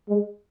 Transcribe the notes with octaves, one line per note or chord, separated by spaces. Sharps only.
G#3